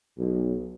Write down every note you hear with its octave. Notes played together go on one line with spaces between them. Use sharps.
B1